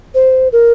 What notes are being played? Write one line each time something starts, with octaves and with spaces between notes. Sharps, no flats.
C5
A#4